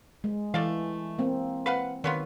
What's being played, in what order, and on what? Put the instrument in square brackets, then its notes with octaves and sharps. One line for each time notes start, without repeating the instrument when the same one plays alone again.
[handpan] G#3
[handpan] E3 [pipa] A3 D5 F5
[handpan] A#3 C4
[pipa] B4 F5 F#5
[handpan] D#3 [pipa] F#3 B3 F4